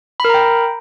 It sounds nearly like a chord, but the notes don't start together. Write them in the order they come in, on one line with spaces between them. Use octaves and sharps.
B5 A#4 A#5 G5